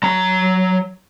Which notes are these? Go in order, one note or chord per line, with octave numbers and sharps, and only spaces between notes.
F#3 A#5